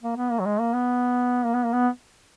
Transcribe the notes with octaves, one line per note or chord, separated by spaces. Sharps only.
A#3
B3
A#3
F#3
G#3
A#3
B3
A#3
B3
A#3
B3